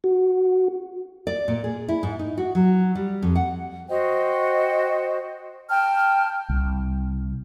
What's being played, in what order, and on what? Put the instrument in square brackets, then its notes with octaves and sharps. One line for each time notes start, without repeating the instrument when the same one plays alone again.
[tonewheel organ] F#4
[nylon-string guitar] D5
A#2
G#4
E4
G#2
D#4
F#4
F#3
G3
F2
F#5
[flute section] F#4 C5 D#5 G5
G5 A5 F6
[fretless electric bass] C2